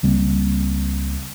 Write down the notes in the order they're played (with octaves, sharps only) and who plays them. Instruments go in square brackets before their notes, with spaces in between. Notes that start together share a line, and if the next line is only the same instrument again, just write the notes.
[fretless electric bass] C#2 G3 A#3 C4